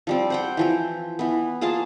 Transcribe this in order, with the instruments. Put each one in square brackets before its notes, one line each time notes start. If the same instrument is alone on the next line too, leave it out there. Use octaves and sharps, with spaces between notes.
[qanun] F3 G3 C4
C5 F#5 G5
E3 F3 G5
E3 B3
A#3 F4 G#4 A5